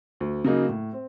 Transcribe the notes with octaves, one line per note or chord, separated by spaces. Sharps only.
D2
C#3 F#3 A#3 D#4
A2
C4